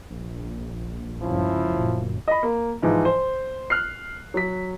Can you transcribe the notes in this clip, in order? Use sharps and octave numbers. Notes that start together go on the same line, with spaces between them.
A#1
C#2 G2 F3 C#4 E4
G1 F#2 A#2
D#5 B5
A#3
G#2 E3 F3
C5
F6 F#6 C7
F#3 B6